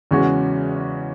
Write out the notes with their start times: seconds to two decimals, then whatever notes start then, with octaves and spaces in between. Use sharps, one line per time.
0.11 E2 C#3 G#3 C#4 F#4